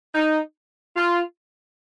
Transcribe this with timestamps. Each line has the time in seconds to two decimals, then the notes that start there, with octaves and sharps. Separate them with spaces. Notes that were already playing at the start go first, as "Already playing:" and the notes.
0.14 D#4
0.96 F4